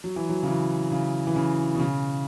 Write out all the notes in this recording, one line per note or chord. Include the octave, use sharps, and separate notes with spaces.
F#3
E3
F#3
C#3
E3
C#3
E3
C#3
B2
C#3